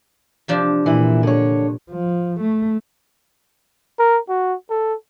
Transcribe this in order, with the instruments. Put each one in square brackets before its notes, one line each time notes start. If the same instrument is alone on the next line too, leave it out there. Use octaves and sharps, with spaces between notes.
[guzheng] C3 F3 D4
[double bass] A#2 [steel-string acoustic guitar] E3 E4
[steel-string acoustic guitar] D3 C#5
[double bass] F3
A3
[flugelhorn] A#4
F#4
A4